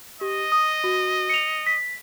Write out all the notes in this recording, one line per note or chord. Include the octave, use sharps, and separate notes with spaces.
G4 D#5
D#6
F#4
C#7 F7
B6